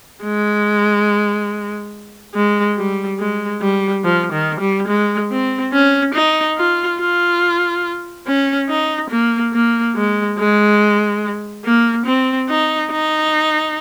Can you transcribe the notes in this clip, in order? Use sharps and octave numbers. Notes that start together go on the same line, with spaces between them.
G#3
G#3
G3
G#3
G3
F3
D#3
G3
G#3
C4
C#4
D#4
F4
F4
C#4
D#4
A#3
A#3
G#3
G#3
A#3
C4
D#4
D#4